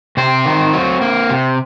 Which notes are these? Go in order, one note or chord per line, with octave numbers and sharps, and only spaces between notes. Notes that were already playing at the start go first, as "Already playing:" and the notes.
C3 C4 C5
D#3
F#3
A#3
C3